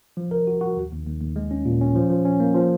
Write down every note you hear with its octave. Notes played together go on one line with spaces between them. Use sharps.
F3
A#4
F#4
F#4
D#2
D#2
D#2
D#2
G#3
C#4
A#2
C#4
F3
F3
C#4
A#3
F3